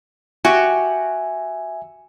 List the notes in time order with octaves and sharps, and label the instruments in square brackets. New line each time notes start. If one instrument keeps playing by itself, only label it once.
[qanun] F#4 G4 [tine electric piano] E5 G#5